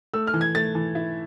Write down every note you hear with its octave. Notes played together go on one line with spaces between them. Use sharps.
A3 E6
F6
E3
G#6
A3 A6
E3
E4